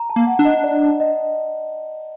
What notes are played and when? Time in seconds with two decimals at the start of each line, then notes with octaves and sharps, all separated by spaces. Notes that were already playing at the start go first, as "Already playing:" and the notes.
Already playing: A#5
0.10 A5
0.16 A#3
0.27 F#5
0.39 D4
0.45 D#5
0.64 D5
1.00 D#5